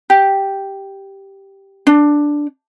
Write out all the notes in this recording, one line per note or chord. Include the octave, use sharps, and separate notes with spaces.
G4
D4